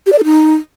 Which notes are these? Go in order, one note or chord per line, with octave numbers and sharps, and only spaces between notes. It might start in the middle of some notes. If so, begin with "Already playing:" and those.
G4
D5
A4
D#4